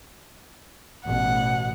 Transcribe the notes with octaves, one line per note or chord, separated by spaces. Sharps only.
A1 B2 F#5